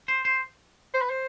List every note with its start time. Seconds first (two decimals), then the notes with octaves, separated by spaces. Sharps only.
0.08 C5
0.25 C5
0.94 C5
1.02 B4
1.10 C5